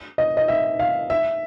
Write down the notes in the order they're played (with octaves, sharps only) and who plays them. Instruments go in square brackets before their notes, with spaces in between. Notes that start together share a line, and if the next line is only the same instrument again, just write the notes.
[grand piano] D#5
D#5
E5
F5
E5